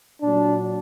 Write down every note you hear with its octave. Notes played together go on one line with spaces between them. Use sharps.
A#2 F#3 D4